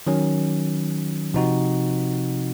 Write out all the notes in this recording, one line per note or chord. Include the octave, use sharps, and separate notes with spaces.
D#3 F#3 C#4
C3 F3 C4 D#4 F#4